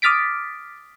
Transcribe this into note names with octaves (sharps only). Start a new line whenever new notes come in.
D6 D#6 F6 A6 B6 D7